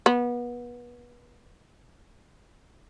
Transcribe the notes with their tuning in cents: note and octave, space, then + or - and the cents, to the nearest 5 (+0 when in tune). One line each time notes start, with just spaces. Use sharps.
B3 -30